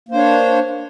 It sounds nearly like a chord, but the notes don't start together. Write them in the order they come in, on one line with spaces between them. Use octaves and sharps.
A#3 C5 D4 C#5